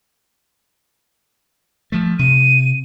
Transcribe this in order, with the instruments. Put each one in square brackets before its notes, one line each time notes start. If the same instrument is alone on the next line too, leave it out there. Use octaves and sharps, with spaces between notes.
[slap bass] F3 A3
[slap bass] C3 [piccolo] D#7